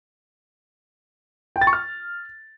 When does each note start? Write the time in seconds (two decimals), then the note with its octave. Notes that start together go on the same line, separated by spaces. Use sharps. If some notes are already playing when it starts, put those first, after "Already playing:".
1.56 G5
1.61 A6
1.67 C#6
1.73 F6